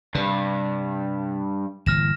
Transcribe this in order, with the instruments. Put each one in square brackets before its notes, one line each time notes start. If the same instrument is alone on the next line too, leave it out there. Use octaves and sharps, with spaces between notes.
[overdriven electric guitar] G2 [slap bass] C3
[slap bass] G1 A#2 E3 [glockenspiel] F6 A#6 E7